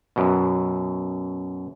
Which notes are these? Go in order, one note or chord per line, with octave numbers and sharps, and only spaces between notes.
F#2 B2